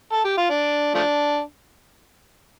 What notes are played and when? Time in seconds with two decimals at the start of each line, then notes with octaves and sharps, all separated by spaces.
0.12 A4
0.25 G4
0.38 F4
0.50 D4
0.94 F3 A3 D4